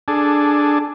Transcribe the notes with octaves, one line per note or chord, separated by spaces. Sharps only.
D4 G#4 A4